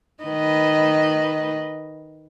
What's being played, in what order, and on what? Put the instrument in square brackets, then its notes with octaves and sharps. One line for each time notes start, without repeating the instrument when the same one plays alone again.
[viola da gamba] D#3 B4 D#5